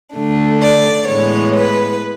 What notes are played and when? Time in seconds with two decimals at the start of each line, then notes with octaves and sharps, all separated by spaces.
0.14 D3 A3 D4
0.61 D5
1.07 A2 E3 G#3 B3 C#5
1.55 B4